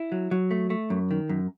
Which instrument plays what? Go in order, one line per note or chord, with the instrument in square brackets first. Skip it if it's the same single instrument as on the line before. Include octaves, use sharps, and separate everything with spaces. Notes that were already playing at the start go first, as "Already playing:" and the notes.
Already playing: [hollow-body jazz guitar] E4
F#3
F#3
A3
A3
F#2
D#3
F#2